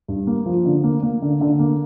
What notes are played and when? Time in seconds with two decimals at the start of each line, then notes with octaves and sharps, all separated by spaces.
0.08 G2
0.27 A#3
0.46 F3
0.65 D3
0.84 A#3
1.03 A#3
1.22 D3
1.41 D3
1.59 A#3